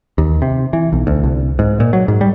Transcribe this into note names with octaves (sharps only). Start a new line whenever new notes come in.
D#2
C3
E3
B1
D2
C2
G#2
A#2
F#3
G#2
G3